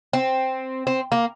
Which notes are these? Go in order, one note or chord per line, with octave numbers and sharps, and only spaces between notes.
C4
C4
A#3